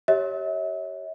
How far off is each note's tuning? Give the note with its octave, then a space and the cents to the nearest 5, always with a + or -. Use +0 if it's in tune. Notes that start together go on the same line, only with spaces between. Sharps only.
G4 -20 C#5 +0 E5 -40